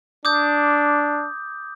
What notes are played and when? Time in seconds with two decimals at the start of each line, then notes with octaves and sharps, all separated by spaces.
0.25 D4 D6 D#6 G6